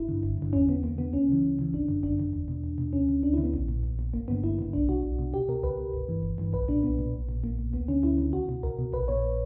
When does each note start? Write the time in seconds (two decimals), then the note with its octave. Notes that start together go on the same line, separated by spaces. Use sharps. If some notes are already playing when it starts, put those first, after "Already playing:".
Already playing: G1 E4
0.09 G2 D3
0.23 G1
0.38 G2 D3
0.53 E2 C#4
0.69 D3 B3
0.83 E2 A#3
0.98 D3 B3
1.13 C#2 C#4
1.28 C#3 E3
1.43 C#2
1.59 C#3 E3
1.73 G1 D4
1.88 F#2 D3
2.03 G1 D4
2.18 F#2 D3
2.33 E2
2.48 B2
2.64 E2
2.78 B2
2.93 D2 C#4
3.09 D3
3.23 D2 D4
3.33 E4
3.38 D3
3.43 B3
3.54 A#1
3.68 A#2
3.83 A#1
3.99 A#2
4.13 G1 A#3
4.28 G2 D3 B3
4.43 G1 E4
4.59 G2 D3
4.73 B1 D4
4.88 B2 F#4
5.03 B1
5.19 B2
5.33 C#2 G4
5.49 B2 A#4
5.63 C#2 B4
5.78 B2
5.94 G1
6.08 G2 E3
6.23 G1
6.38 G2 E3
6.53 B1 B4
6.68 A#2 D4
6.83 B1 B3
6.99 A#2
7.13 A#1
7.29 A#2
7.44 A#1 A#3
7.58 A#2
7.73 D2 B3
7.88 D3 C#4
8.03 D2 E4
8.18 D3
8.33 C#2 F#4
8.49 B2
8.63 C#2 A#4
8.79 B2
8.93 A#1 B4
9.08 A#2 C#5